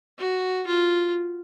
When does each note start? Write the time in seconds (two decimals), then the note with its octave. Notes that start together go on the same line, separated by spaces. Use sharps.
0.19 F#4
0.67 F4